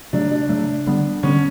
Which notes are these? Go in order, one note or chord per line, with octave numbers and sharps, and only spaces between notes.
C#3 F#3 A3 D4
D4
C#3 F#3 A3
D3 G3 B3
D3 G3 B3 C#4